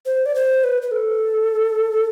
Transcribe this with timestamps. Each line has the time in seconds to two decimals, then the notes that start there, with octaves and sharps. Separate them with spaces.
0.06 C5
0.26 D5
0.35 C5
0.64 B4
0.82 B4
0.91 A4